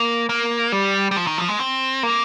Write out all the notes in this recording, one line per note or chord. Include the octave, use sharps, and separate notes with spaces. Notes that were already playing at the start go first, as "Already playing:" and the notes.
Already playing: A#3
A#3
G3
G3
F3
D#3
F3
G#3
C4
A#3